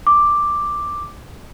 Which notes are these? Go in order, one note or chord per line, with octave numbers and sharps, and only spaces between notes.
D6